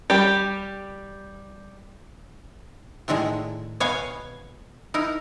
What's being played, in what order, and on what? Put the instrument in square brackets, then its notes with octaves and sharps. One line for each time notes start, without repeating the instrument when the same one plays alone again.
[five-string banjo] G3 G4
[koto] A2 D3 D#3 G#3 G#4
B2 B3 C#5 F5 G#5
D#4 E4 A#4